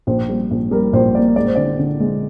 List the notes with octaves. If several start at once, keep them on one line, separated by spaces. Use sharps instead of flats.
A#1 C5
G3
A#1
G3 A#4
A#1 C5
A#3 D5
G#3 D5
C5
D3 D5
D3
G#3